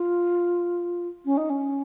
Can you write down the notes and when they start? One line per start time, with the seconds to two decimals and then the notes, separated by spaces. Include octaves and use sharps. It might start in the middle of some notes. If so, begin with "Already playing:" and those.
Already playing: F4
1.25 C#4
1.37 D#4
1.49 C#4